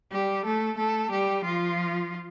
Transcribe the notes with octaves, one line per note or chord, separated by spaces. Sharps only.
G3 G4
A3 A4
A3 A4
G3 G4
F3 F4